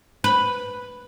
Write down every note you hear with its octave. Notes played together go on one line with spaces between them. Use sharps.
B4